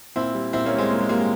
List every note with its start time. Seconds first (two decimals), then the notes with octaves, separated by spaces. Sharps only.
0.16 A#2 C4 E4
0.34 G3
0.53 A#2 C4 E4
0.66 A#3 C#4
0.73 G3
0.78 G#3 C4
0.91 A#2 A#3
1.01 G#3
1.09 G3 A#3
1.19 G#3